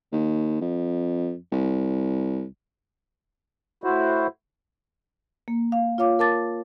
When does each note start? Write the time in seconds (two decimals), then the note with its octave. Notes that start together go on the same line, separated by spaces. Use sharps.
0.12 D#2
0.61 F2
1.52 C2
3.84 A2 E4 F#4 C5
5.48 A#3
5.72 F5
5.98 F4 C#5 F5 D6
6.19 A#4 A5 D6 A6